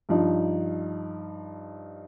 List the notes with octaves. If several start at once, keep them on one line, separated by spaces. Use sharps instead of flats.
G2 F3 D#4